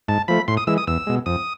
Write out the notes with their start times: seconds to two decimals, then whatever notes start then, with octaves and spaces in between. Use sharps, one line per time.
0.08 G#2 A5
0.28 F3 A3 B5
0.48 A2 C6
0.57 D#6
0.67 E3 G#3 E6
0.78 D#6
0.87 E2 E6
1.07 B2 G#3
1.26 F2 D#6